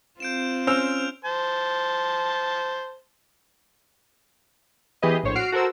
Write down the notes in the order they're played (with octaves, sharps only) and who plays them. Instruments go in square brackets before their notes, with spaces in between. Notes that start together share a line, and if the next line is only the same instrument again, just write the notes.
[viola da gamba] C4 F4 [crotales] G6 D7 E7
[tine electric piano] C#4 [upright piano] C5 E6 [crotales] F6 D7 F7
[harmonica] C5 A5
[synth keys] E3 B3 G4 G#4 B4 D#5
A#1 A2 C5 C#5
F#4 F6 C7 D7
F#4 A4 A#4 C5 E6